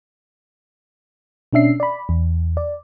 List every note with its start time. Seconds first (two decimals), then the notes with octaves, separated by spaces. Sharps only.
1.53 B2 C#4 D4 E5 C7
1.80 D5 B5
2.09 E2
2.57 D5